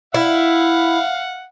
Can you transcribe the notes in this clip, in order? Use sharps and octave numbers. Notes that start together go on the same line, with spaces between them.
E4 F5 F#5